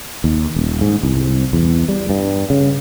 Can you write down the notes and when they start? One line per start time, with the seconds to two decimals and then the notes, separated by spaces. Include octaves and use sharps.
0.24 D#2
0.56 D#1
0.81 G#2
1.03 C2
1.53 E2
1.88 G3
2.10 G2
2.50 C#3